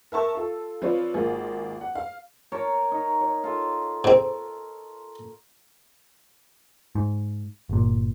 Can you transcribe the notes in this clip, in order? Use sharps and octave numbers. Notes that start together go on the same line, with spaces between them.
A#4 E5 A5 C#6
F4 A4
F3 C4 F4 B4 C#5 D5
G#1 A#3 F4 G#4
F#5
F5
A#4 C#5 A5
D#4
C#5
F4 A4
G#2 C4
G#2
G1 A#2